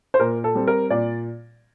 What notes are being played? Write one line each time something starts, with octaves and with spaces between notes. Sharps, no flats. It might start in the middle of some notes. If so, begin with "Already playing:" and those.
C5
A#2 A#4
A4
G3 C4
A#4
A#2 D5